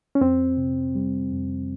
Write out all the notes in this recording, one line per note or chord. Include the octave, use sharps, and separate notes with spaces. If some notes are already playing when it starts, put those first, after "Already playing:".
C#4
F2 C4
C3
G3
F2